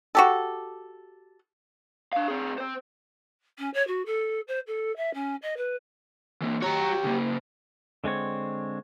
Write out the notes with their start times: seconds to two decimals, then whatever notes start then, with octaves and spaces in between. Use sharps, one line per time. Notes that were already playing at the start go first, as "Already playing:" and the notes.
0.15 F#4 G4 A4
2.13 D4 F5
2.28 C4 G#4
2.58 C4 C5
3.58 C#4
3.74 C#5
3.87 F#4
4.06 A4
4.48 C5
4.67 A4
4.96 E5
5.14 C#4
5.42 D#5
5.57 B4
6.42 E3 A#3
6.62 F#4 G4 C#5 A#5
7.04 C#3 A#3
8.04 D3 G#3 C4 C#5